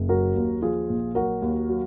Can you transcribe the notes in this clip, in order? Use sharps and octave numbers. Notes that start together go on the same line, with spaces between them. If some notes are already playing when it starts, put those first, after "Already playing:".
Already playing: F#1
F#3 F#4 A#4
D#2
F3 F4 G#4
A#1
F#3 F#4 A#4
D#2
F#3